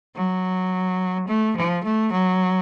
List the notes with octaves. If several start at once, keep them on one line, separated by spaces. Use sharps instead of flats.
F#3
A3
F3
A3
F#3